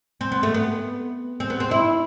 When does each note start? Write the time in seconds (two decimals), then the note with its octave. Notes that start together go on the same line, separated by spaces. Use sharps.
0.21 C4
0.32 B3
0.43 A3
0.54 B3
1.40 C4
1.50 B3
1.60 C4
1.71 E4